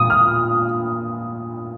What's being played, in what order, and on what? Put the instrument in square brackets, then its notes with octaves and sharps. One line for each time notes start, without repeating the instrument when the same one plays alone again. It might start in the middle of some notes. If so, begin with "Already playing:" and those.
Already playing: [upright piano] A#2 D#6
F6